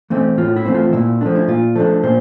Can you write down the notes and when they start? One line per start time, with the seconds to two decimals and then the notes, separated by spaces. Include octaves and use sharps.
0.10 E3 A3 C4
0.38 A2 F4
0.56 E4
0.65 E3 A3 C4
0.75 F4
0.93 A#2 E4
1.21 F3 A3 D4
1.35 E4
1.48 A#2 F4
1.76 F3 A3 D4 A4
2.03 A#2 C5